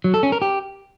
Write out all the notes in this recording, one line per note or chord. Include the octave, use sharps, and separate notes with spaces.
F#3
A4
C#4
A#4
G4